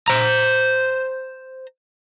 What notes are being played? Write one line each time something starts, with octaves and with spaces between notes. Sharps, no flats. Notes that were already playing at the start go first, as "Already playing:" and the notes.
C5 A#5